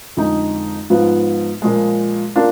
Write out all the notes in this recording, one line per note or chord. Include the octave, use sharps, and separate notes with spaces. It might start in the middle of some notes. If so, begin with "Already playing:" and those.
F2 D3 G#3 D#4
G#2 F3 B3 F4
A#2 F3 G#3
A#3 D4 F4